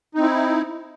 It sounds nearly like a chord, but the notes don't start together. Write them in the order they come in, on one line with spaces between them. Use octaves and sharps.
D#4 C4 E4